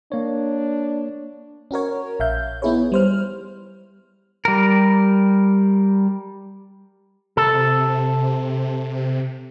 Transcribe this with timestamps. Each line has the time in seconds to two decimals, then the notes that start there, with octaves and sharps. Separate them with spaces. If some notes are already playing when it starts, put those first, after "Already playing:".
0.12 A#3 D4 C#5
1.71 C#4 F#4 A#4 C#5
2.20 A#1 E5 F5 G6
2.62 B3 D#4 E4 G#4 B4 C#5
2.92 G3 C5 F6
4.45 G3 A#4
7.37 C3 A4